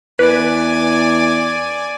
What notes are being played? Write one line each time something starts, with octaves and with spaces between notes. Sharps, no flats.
E2 B4 D5 G#5